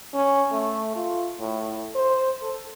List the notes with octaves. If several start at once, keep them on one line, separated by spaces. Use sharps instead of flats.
C#4
A3
F4
A2
C5
A4